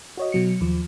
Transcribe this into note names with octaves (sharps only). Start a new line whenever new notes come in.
F#4 C#5 D#5
B2 F#3 C#7
D#2 F3